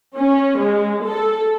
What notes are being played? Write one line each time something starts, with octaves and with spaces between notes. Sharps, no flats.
C#4
G#3
A4